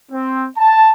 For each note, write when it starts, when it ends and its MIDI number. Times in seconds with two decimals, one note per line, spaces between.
0.12 0.48 60
0.57 0.92 81